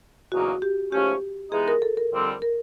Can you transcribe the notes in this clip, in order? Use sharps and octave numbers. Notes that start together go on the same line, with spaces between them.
E2 C#3 F#3 A#3 D#4 F#4
G4
G#2 F3 A3 C#4 G4
E3 G#3 B3 D#4 G#4
A#4
A4
A#4
F2 D3 G3 C4
A#4